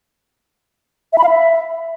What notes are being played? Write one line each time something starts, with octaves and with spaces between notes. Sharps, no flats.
E5
B5
F5
E5